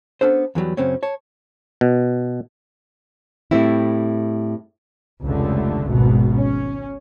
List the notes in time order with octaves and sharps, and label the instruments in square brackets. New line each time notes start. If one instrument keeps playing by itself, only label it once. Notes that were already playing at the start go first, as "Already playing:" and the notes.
[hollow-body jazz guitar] B3 C#4 D4 A4 C5
E2 E3 F#3 G3
F#2 C#3 C4 C#4
C#5 A5
[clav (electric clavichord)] B2
[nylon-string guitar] A2 G3 A3 C4 E4
[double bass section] F1 C#2 D3 A3
G#1 B2
C#4